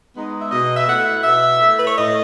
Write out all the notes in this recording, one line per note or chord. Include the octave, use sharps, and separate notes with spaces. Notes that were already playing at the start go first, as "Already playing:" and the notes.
G#3 B3 D#4
E5
B2 D#5
E5
A3 E4 F#5
B2 E5
A3 E4
B4
C#5
A2 D#5